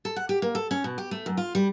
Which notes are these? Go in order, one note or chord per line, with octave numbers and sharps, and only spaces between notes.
A4
F#5
G4
A#3
A4
C#4
B2
G4
A3
F#2
F4
G3